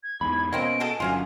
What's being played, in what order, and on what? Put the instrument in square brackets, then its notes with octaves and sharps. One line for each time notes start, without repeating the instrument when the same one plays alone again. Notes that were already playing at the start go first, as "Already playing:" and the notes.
[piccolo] G#6
[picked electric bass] E2 G#2 [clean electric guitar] B5
[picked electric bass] B2 [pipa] A#3 C4 C#4 [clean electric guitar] D#5 [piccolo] D7
[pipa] F#4 G#4 A4
[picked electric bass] G1 F#3 [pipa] D3 C#4 F4 [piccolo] G#5